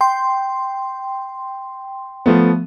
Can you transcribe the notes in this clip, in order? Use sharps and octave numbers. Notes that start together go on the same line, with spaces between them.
G5 C6
F3 A3 B3